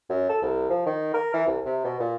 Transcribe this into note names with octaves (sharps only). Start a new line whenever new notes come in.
F#2
A4
C2
F3
D#3
A#4
E3
C2
C3
B2
A#2